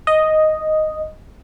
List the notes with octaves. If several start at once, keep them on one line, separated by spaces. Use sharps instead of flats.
D#5